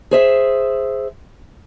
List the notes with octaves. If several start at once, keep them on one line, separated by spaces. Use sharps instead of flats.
G#4 C5 E5